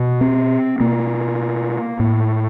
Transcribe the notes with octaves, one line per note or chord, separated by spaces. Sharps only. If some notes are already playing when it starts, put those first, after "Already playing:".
Already playing: B2
C4
B2 A#3
A2